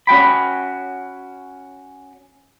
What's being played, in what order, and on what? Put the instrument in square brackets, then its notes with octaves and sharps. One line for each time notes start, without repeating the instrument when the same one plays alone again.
[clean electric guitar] C#4 F#4 G5 B5